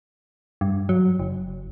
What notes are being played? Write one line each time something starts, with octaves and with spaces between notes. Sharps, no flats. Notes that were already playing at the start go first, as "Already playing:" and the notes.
G2
F#3
F#1